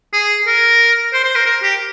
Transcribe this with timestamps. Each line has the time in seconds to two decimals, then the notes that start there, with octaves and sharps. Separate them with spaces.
0.13 G#4
0.47 A#4
1.13 C5
1.24 C5
1.35 A#4
1.46 A#4
1.63 G4